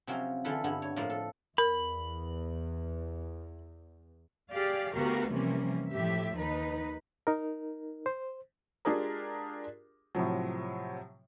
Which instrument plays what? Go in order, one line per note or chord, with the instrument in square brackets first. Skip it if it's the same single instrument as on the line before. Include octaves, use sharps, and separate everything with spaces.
[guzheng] C3 F3 F#3 C4 C#4
D3 E3 F4 A4 B4
G2 D3 B3 E4
C#5
A2 F3 A#3 D5
A4
[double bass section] E2 [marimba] A#4 [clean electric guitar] B5
[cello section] G4 G#4 D5 F5
D2 B3 F#4 G4 A#4 F5
C3 E3 F3 G3 A#3 C#4
A2 F3 G4 E5
D#2 D#4 B4
[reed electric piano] D#4 A#4
C5
[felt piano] G#3 D4 F4 G4 G#4 A#4
A2 C3 F3 F#3